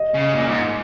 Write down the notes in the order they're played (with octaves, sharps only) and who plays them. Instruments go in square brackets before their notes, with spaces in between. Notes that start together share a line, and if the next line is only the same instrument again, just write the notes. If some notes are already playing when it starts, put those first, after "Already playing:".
Already playing: [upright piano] D#5
[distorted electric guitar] C#3
A#2
G#2